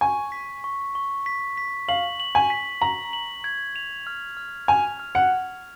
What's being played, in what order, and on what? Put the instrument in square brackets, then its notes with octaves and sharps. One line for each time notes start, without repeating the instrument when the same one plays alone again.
[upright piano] G#5 [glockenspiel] C#6
[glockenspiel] B6
C#6
C#6
B6
B6
[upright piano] F5 [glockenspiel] F#7
[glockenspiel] F#7
[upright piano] G#5
[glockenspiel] B6
[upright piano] A#5 [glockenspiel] F#7
[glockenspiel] F#7
G#6
F7
F6
F6
[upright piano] G#5 [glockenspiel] F7
[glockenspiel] F6
[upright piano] F#5
[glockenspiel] F6